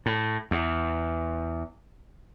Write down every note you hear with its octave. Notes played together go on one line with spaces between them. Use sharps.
A2
E2